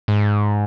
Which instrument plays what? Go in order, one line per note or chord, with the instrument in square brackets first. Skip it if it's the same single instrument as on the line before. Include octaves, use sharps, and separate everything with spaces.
[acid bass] G#2